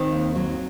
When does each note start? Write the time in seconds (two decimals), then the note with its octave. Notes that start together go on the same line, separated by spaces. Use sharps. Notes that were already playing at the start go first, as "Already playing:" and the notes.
Already playing: D#3 C4
0.12 D#2
0.35 F#3